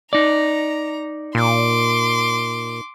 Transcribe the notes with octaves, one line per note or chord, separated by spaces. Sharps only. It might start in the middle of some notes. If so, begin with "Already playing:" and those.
D#4 D5 A#5
A#2 C6 D6